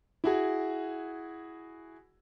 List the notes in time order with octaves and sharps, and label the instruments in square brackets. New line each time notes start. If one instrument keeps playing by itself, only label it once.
[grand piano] E4 F#4 G#4